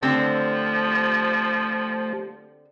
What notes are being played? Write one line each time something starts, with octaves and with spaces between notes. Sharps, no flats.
D3 F3 A3 C4 G4 C5